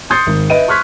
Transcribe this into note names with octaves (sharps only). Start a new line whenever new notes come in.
C6 D#6 G6 A6 C7 C#7
G#1
B4 D#5 E5 D7 D#7
C6 C#6 F6 F#6 G#6 B6